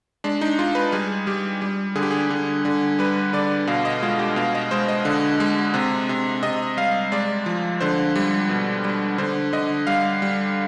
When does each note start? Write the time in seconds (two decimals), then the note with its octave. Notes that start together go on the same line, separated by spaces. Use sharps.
0.24 G#3 D4
0.41 D#4
0.59 G#3 F4
0.75 B4
0.92 G3 G#4
1.27 G3 G4
1.62 G3
1.95 D3 G#4
2.03 G4
2.11 G#4
2.30 D3
2.65 D3
2.99 G3 B4
3.33 D3 D5
3.67 B2 F5
3.85 D#5
4.02 G#3 F4
4.19 G4
4.36 B2 F5
4.55 D#5
4.71 G#3 C5
4.89 D#5
5.05 D3
5.40 G#3
5.74 C3
6.09 C3
6.43 C3 D#5
6.77 G3 F5
7.12 G#3 D5
7.46 F3
7.80 D3 C5
8.16 G3
8.49 B2
8.85 G3
9.18 D3 C5
9.53 D3 D#5
9.87 G3 F5
10.22 G3